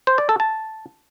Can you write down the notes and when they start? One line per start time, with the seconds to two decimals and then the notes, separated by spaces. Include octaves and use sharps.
0.07 C5
0.18 D5
0.29 A4
0.40 A5